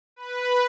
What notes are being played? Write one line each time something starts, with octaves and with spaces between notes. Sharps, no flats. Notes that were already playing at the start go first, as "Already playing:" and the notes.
B4